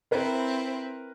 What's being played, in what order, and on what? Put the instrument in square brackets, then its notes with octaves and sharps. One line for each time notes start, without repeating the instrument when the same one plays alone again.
[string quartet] C4 E4 [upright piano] A#4 B4